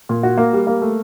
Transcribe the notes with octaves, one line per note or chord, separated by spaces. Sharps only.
A#2
F#4
A#3
G3
A#3
A3